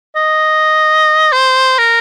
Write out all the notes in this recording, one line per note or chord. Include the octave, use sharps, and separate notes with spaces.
D#5
C5
A#4